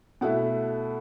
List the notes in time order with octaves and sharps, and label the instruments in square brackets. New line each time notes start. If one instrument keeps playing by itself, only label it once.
[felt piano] B2 A3 E4 F#5